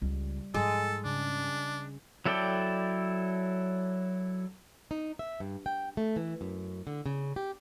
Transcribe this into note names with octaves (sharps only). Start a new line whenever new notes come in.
C#2 G3
G#2 F3 G#3 A4
C#3 D4
F#3 E4 A4 D5 G5
D#4
E5
G2
G5
A3
E3
F#2
D3
C#3
G4